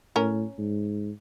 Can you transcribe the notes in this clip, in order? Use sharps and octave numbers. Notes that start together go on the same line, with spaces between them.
A2 C#4 A#4
G#2